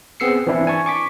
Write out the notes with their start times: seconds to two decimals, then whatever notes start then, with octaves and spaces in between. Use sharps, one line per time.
0.20 B3 C4 G#4 E6 C7 C#7
0.47 E3 C4 D4 E4
0.67 G#5 A5 C#6
0.86 C#6 D6 B6